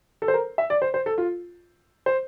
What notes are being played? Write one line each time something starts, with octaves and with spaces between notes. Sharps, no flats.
A4
C5
A#4
E5
D5
C5
C5
A4
F4
C5